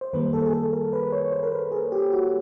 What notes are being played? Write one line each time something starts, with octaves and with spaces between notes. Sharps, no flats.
C5
F#2 D#3 G3 A#3 B4
A4
G#4
A4
A#4
B4
C#5
C5
A#4
B4
G#4
G4
F#4